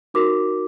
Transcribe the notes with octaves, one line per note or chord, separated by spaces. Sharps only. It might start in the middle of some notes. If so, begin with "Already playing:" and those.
D#4 F#4 A#4 D6